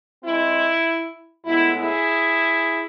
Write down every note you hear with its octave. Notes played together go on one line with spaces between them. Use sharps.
E3 G#3 C4 E4
A2 G#3 B3 E4
E4 G#4